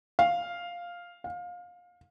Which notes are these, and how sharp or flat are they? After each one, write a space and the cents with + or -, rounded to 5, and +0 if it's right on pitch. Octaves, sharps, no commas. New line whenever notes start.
F5 +0
F5 +25